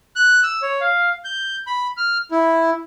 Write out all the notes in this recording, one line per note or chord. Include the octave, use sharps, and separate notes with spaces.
F#6
E6
C#5
F5
G6
B5
F6
E4